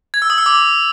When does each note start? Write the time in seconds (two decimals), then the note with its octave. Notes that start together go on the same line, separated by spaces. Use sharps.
0.14 G#6
0.22 E6
0.30 D#6
0.38 E6
0.46 D6